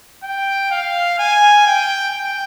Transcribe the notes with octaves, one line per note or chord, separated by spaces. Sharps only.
G5
F5
G#5
G5
G5